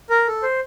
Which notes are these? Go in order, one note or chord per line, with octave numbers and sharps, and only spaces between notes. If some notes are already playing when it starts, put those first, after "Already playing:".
A#4
A4
C5